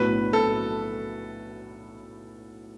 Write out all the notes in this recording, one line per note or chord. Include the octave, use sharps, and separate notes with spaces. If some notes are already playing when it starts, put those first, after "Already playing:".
Already playing: B1 A2 F#3 B3 D4 B4
A4